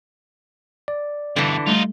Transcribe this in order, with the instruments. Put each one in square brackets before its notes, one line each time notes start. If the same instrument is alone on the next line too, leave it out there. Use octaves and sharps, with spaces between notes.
[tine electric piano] D5
[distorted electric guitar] G2 B2 [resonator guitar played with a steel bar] D3 E3
[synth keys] G3 A3 [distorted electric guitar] D#4 F4